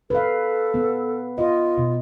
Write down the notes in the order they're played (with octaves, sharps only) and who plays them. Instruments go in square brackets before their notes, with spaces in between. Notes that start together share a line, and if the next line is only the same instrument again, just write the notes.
[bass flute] A4 [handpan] B4 F5
[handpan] B3
[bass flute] F4 [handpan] D#5
[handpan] B2